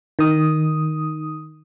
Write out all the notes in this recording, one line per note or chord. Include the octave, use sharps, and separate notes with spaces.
D#3 D#6